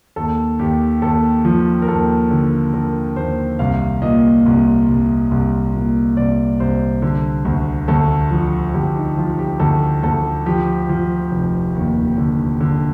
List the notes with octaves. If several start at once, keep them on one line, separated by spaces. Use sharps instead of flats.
D#2 A4
D#2 G4
D#2 A4
F3
A#4
D#2 A4
D3
D3 A#4
D#2 C5
C2 F5
A#2 D#5
C2
C2
C2
A#2
C2 D5
C2 C5
D3
D2
D2 A4
F3
D2 G4
D#4
F3 F4
G4
D2 A4
D2 A4
F3 G4
F3
F1
D#2
D3
D3